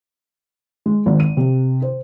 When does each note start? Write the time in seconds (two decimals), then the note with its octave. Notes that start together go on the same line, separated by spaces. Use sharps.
0.86 G#3
1.06 G#1
1.20 D#7
1.37 C3
1.82 C5